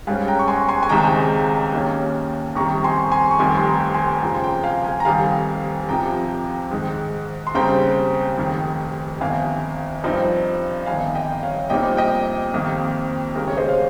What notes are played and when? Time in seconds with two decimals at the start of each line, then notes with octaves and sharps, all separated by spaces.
0.07 G#2 G3 C#4 F5 G#5
0.28 G5 A#5
0.39 C#6
0.48 G#5 C6
0.68 G#5 C6
0.83 G#5
0.89 C#2 C3 D#3 G#3 D#4 G5 A#5
1.73 D#2 D#3 A#3 C#4
2.55 F2 C3 D#3 G3 A#5 C#6
2.84 G#5 C6
3.11 G#5 C6
3.31 C#6
3.39 F1 F2 D#3 G3 G#5 C6
3.57 C6
3.66 G5 A#5
3.94 G#5 C6
4.22 F2 C#3 F3 G5 A#5
4.34 C6
4.43 G5 A#5
4.64 F5 G#5
4.84 F5 G#5
5.00 A#5
5.05 F1 F2 D#3 G3 F5 G#5
5.89 F2 C3 F3 G5 A#5
6.71 G#2 D#3 G#3 D#4
7.47 C6
7.54 D#2 C#3 G3 C4 G5 A#5
8.38 F1 F2 D#3
9.20 G1 F2 D#3 F5 G#5
10.04 G2 F3 C4 D#4
10.86 G1 F2 D#3 F5 G#5
11.15 D#5 G5
11.43 C#5 F5
11.70 A#1 A#2 G3 C4 D#4 D#5 G5
11.97 D#5 G5
12.54 F2 C3 D#3 A#3
13.36 D#2 C#3 G#3 A#4
13.48 C#5
13.57 C5 D#5
13.68 F5